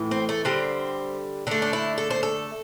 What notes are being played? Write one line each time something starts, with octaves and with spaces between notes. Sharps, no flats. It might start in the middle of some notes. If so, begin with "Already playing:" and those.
Already playing: A2 E3
C4
A3
D3 G3 C4
D3 A3 D4
D4
E4
A4
C5
A4